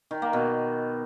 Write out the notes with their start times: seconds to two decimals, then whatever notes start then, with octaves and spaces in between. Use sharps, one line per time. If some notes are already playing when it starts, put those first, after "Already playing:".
0.11 D#3
0.22 A#3
0.33 B2